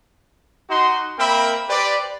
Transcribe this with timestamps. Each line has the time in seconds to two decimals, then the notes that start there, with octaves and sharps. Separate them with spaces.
0.70 D#4 F#4 C6
1.19 A#3 C4 A#4 E5 G5 B5
1.69 G4 B4 C5 D5